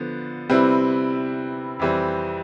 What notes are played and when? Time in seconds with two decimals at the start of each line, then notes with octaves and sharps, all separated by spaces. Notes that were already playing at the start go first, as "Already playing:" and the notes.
Already playing: D3 F3 B3
0.49 C3 G3 C4 E4 B4
1.79 F2 E3 G3 C4